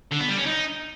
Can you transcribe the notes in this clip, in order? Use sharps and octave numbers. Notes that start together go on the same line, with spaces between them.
D3
B3
G3
C#4
D#4